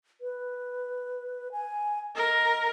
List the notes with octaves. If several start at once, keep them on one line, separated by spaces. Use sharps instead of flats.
B4
G#5
A#4 D#5